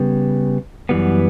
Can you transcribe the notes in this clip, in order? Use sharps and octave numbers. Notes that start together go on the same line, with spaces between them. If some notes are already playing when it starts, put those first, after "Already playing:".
Already playing: C#3 G3 B3
F#2 E3 G3 B3